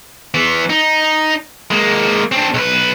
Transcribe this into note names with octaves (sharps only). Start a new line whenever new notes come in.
E3 B3
D#4
G#3 A#3
C4 D4
B1 B4